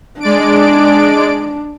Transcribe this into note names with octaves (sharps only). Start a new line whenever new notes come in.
G#3 D4 D5 D7